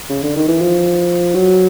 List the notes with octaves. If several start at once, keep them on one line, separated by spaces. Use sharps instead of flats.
C#3
D3
D#3
E3
F3
F#3